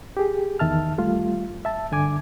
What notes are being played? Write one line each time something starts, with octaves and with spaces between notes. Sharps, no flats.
G4 G#4
E2 D#3 E5 A5 F6
G3 A3 F4
E5 A5
G2 D3 G#5 D6 G#6